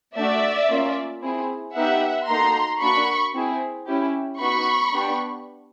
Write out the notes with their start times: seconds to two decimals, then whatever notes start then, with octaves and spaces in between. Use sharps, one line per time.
0.17 A3 D4 F#4 D5 E5
0.70 A#3 C#4 F4
1.23 C4 E4 G#4
1.76 B3 D#4 G4 E5 F#5
2.28 A#3 D#4 F#4 A4 A#5 C6
2.81 A#3 D4 F#4 B5 C#6
3.34 C4 E4 G#4
3.87 C#4 E4 G4
4.40 B3 D#4 F#4 B5 C#6
4.93 B3 D4 G4